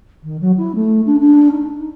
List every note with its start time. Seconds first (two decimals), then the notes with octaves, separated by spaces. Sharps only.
0.23 D#3
0.40 F#3
0.57 E4
0.75 A3
1.06 D4
1.20 D4
1.51 D#4
1.78 D#4